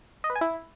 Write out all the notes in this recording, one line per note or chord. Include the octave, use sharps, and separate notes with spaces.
D#5
B4
G#5
E4